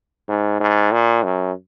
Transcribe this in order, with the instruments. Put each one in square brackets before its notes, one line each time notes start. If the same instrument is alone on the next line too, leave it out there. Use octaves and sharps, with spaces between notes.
[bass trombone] G#2
G#2
A#2
F#2